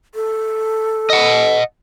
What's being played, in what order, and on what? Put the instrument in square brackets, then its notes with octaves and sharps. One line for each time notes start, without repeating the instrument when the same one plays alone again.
[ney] A4
[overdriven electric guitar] D#5 F#5